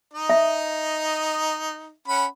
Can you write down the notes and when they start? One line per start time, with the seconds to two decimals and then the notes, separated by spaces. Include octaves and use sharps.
0.14 D#4 D#5
0.30 E5
2.08 C#4 F#5 B5